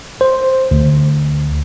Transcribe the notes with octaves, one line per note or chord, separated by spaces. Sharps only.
C5
D2